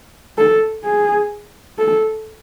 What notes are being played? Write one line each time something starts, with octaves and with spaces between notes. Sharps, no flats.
A4
G#4
A4